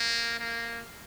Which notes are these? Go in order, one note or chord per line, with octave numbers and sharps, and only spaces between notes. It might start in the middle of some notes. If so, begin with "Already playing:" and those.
Already playing: A#3
A#3